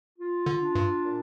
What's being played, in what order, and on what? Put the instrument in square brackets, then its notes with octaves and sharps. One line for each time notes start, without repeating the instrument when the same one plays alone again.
[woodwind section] F4
[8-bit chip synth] D3
[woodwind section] D4
[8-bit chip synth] G2
[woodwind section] A#2